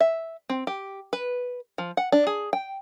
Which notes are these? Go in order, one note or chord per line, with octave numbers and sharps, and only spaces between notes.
E5
C4
G4
B4
F3
F#5
D4
G#4
G5